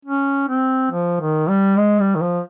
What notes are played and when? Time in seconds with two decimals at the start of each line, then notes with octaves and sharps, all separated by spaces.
0.05 C#4
0.49 C4
0.91 F3
1.20 D#3
1.49 G3
1.77 G#3
2.00 G3
2.15 D#3
2.21 F3